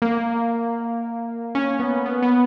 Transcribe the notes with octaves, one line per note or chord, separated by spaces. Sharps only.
A#3
C#4
B3
B3
B3